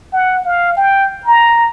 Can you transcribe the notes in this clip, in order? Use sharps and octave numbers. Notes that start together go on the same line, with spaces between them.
F#5
F5
G5
A#5